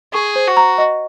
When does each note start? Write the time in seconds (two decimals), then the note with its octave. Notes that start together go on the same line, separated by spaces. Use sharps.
0.13 G#4 C#6
0.36 C5
0.47 F#4
0.57 A#5
0.78 D#5